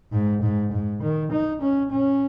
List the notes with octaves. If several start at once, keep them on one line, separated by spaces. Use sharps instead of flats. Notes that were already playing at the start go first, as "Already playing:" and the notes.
G#2
G#2
G#2
D#3
D#4
C#4
C#4